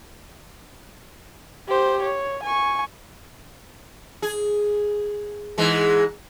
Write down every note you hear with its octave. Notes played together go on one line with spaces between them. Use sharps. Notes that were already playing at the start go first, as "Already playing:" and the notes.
G4 C5
C#5
G#5 C#6
G#4
G#2 E3 G#3